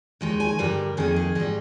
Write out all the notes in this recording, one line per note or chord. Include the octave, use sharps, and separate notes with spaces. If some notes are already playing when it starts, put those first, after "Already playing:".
D#2 D#3 G#3 D#4
G#5
G2 D3 G3 A#4
F2 D#3 A#3 D#4 G#4
G#4
G#2 D#3 G3 D#5